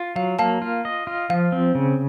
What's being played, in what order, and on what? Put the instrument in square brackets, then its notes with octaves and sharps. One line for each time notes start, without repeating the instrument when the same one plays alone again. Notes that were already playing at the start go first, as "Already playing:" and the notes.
Already playing: [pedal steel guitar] F4
[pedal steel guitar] F#3 [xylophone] F5
[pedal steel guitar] A#3 [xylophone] F5 A5
[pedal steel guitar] F4
D#5
F4
[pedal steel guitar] F3 [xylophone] F5
[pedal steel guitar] C4
C#3